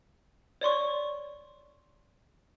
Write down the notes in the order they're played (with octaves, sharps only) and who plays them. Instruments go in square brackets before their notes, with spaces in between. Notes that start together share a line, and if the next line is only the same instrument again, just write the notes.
[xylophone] C#5 D5 C6 C#6